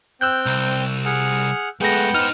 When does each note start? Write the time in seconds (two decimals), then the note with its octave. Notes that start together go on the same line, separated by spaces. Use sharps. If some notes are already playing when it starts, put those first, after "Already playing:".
0.21 C4 G5 E6 F#6 G6
0.46 C2
1.05 G#4 F#5 F6
1.81 G#3 A3 B3 G#4 A4 F#5 G5 A#6
2.15 D#4 C5 F6